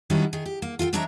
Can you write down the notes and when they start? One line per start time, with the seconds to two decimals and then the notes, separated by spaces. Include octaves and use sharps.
0.10 D#3 F#3 G3 C#4 D4 E4
0.33 D#3 G#4
0.46 G4
0.62 A#3
0.79 F4 A4 E5 G5
0.93 E3 G#3 D4 C#5 E5 A#5